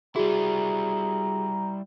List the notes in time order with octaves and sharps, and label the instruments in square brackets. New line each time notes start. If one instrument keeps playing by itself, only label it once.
[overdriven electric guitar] G3 E4 [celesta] F#4 G#4 [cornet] A#5